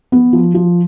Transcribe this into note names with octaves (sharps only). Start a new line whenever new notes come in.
B3
F3
F3